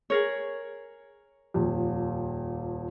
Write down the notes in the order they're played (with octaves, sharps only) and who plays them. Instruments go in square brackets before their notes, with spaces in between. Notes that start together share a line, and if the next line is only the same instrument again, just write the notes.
[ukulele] G#4 A#4 C#5
[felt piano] D#1 F2